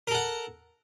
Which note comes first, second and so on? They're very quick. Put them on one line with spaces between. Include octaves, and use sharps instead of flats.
A#4 A4 F#5